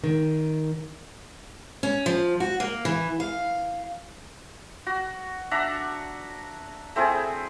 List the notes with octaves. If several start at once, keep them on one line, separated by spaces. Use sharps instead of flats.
D#3
C#4
F3
F#4
A#3
E3
F5
F#4
D4 E5 F#5 A#5
A3 C4 E4 G#4